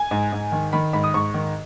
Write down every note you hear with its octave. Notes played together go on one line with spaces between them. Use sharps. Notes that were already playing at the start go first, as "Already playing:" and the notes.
Already playing: G#5
G#2
G#2
D#3
D#3 B5
G#2 B5
D#6
G#2 C#6
D#3